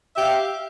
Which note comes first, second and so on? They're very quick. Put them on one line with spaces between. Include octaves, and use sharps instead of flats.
E5 G4 F5